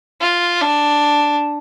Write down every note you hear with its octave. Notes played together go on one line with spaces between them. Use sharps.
F4
D4